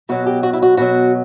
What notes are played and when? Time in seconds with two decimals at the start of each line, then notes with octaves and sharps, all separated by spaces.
0.09 B2 F#3 F#4
0.26 G4
0.43 F#4
0.53 E4
0.62 F#4
0.77 B2 F#3 F#4